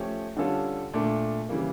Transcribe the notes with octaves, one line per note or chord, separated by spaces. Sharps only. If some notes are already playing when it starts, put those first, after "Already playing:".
Already playing: F3 A3 C#4 G4 C#5
D3 G3 C#4 F4 A4
A#2 A3 D4
C#3 E3 G3 A#3